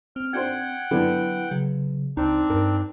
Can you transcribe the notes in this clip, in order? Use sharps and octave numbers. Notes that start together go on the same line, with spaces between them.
C4 F6
D4 F#4 C5 F#5 G5 G#6
D3 F#3 B3 D4 E4
C#3 F#3
C#2 C4 D4 D#4
G2 A#4